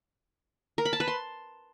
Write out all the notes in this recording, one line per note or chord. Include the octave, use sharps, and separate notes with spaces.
A#4
B5
A5
B4
C6